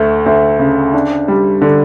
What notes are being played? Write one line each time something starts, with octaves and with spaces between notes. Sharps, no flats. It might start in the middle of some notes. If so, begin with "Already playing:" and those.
Already playing: D2 A3
D2
C#3
D4
G3
D3